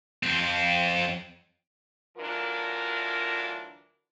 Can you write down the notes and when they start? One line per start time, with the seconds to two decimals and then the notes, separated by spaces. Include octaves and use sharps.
0.23 F2 C4
2.18 D2 E3 F#3 D4 F4 A#4